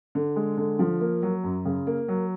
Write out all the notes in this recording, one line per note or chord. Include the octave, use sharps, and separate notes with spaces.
D3
G#3
D3
F3
A#3
F#3
F#2
C#3
A#3
F#3